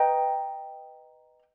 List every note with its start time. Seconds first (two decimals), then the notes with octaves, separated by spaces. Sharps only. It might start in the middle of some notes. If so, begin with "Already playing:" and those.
Already playing: B4 D#5 G5 A#5